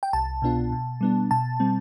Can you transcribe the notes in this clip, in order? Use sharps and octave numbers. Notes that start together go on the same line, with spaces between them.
G5
C2 A5
B2 B3 D4 F4
B2
G3 B3 D4
B2 A5
G3 C4